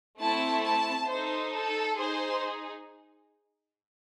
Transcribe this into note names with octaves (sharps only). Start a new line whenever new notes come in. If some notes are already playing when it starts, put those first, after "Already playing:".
A3 C4 E4 A5
A5
D#4 A4 C5
A4
D#4 G#4 C5